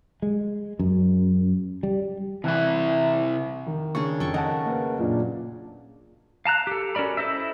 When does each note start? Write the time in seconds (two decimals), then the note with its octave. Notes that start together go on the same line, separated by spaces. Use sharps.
0.22 G#3
0.79 F#2
1.83 G3
2.44 C3 E3 E4
3.66 D#3
3.95 C#3 D4 G#4 C#6
4.20 F2 A4 G5 C#6
4.34 A#4 D#5 F#5 A5
4.65 A#3 B4
4.98 F#2 A#2 D4
6.45 F5 A5 A#5 F#6
6.67 G4 A4
6.95 C#4 F#4 A#4 D5 B5
7.17 E4 A4 C5 D#5 E5